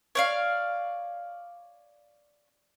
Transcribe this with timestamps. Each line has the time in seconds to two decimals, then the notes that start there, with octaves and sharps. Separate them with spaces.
0.15 C#5 D5 F5